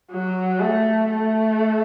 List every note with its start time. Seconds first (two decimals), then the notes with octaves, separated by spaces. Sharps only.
0.11 F#3
0.60 A3
1.09 A3